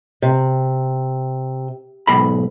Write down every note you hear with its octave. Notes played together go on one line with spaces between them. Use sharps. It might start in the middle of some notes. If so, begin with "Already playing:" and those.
C3
B1 G#2 B5